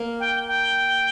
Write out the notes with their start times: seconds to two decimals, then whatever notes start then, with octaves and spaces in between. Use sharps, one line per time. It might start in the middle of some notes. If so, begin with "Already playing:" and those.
Already playing: A#3
0.20 G5
0.47 G5